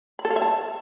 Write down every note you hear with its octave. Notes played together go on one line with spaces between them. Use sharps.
B5
A4
F5
E5
A5